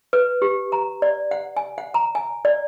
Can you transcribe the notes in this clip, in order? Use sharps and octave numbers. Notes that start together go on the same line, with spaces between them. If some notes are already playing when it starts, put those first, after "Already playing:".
B4
G4
A#5
D5
F#5
G#5
F#5
A#5
G#5
D5